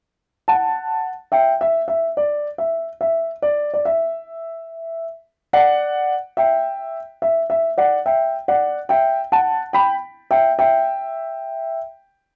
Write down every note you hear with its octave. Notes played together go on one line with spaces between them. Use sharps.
F#5 A5
E5 G5
E5
E5
D5
E5
E5
D5
D5
E5
D5 F#5
E5 G5
E5
E5
D5 F#5
E5 G5
D5 F#5
E5 G5
F#5 A5
G5 B5
E5 G5
E5 G5